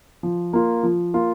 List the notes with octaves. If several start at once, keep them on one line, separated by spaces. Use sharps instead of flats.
F3
A#3 F4
F3
A#3 F4